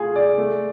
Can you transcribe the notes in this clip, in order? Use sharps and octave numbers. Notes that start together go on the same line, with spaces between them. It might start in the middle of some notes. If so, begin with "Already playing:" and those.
Already playing: A3 F4 G#4
D5
A3